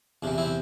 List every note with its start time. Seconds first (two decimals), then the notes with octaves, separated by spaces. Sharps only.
0.23 E2 C3 E3 D4
0.38 C4 E4